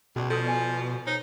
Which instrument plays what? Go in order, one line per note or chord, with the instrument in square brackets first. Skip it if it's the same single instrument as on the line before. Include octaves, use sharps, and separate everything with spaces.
[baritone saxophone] C#2 [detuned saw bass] B2 [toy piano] F#4 D5
[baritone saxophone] F3 [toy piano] A4 D#6
[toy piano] D5 G#5
[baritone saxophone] D#4 [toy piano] C5 C#5